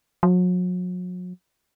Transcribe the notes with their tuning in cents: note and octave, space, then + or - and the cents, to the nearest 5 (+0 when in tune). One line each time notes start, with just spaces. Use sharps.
F#3 -40